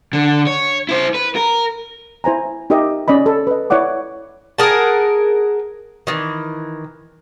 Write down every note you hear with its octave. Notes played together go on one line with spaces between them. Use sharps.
D3
C#5
E4 C5
B4
A#4
E4 C5 G#5 A#5
D#4 G4 A#4 D#5 E5
C#4 D5 D#5 B5
A4
B4 D#5
E4 C#5 D5 F#5 D6
G#4 A#4 F#5 A5
D#3 E3